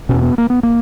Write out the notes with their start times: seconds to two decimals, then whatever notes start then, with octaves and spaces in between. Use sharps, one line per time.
0.09 E2 B2 C#4
0.23 B3
0.38 A#3
0.50 B3
0.63 A#3